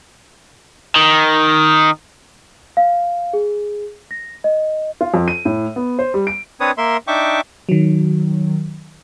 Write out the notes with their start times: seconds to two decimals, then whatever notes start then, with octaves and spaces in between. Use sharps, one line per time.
0.96 D#3
2.77 F5
3.33 G#4
4.11 A#6
4.44 D#5
5.01 F4
5.14 F2
5.28 D#7
5.45 A2
5.76 B3
5.99 C5
6.14 G3
6.27 D7
6.60 C4 D4 B4 C#5 D#6
6.78 A#3 A#4 E5 C6
7.08 D4 D#4 E5 G5 C#6 D6
7.69 D#3 F#3